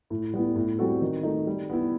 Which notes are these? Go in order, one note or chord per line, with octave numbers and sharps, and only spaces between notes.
A2
G3 B3 E4
A2
G3 C4 F#4 A4
D#3
A3 D#4
G3
B3 E4